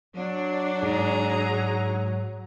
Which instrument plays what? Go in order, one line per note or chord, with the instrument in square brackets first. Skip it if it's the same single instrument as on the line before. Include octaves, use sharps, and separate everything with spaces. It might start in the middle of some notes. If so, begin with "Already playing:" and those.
[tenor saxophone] F#3 [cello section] D4
[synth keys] G#2 [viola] G#4 A#5